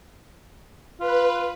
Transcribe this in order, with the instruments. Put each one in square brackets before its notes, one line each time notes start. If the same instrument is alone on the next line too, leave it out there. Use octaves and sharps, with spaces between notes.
[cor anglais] F4 [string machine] B4